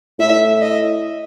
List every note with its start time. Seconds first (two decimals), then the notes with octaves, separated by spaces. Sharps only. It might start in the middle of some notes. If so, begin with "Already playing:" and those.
0.19 A2 E5
0.61 D#5